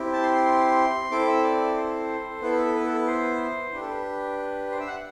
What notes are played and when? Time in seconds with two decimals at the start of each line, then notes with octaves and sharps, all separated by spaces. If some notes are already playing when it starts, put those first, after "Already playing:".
Already playing: C4 E4 G4
0.13 A5
0.23 C6
0.34 C6
0.45 C6
1.11 C4 E4 A4 D6
1.28 E5
1.43 D5
1.77 C5
2.30 A4
2.42 B3 E4 A4 B4
2.59 A4
2.75 B4
2.85 A4
2.97 B4
3.07 C5
3.73 D4 G4 B4
3.81 A4
3.89 B4
4.71 C5
4.80 E5
4.88 F#5